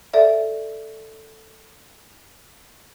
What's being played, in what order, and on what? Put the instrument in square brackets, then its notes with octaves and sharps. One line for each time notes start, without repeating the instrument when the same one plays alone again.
[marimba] A4 D5 E5